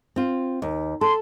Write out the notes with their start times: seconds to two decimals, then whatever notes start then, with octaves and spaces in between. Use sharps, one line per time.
0.16 C4 F4
0.62 D#2
1.01 A4 C6